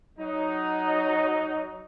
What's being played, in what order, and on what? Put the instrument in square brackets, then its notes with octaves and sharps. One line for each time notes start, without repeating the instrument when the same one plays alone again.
[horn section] F#3 D#4